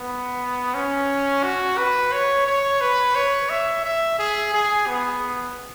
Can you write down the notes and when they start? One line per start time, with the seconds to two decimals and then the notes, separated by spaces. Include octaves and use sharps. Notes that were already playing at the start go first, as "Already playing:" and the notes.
Already playing: B3
0.75 C#4
1.44 F#4
1.78 B4
2.13 C#5
2.47 C#5
2.81 B4
3.15 C#5
3.50 E5
3.84 E5
4.19 G#4
4.53 G#4
4.87 B3